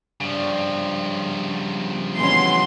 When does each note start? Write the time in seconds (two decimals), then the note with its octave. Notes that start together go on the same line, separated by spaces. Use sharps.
0.20 G2 C#3 F3
2.19 B2 E3 C#4 B5 C6